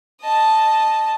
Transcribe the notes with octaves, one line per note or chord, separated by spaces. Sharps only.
D#5 A5